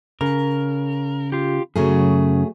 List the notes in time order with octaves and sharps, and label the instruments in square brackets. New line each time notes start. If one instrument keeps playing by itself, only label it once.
[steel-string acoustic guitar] C#3 [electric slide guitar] A#4
[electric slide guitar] F4 G4
[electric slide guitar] F#2 C#3 [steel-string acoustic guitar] F#3 A3 G#4